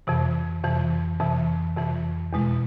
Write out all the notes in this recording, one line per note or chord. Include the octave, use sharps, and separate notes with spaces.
F2 C3 E3
F2 C3 E3
F2 C3 E3
F2 C3 E3
E2 B2 G#3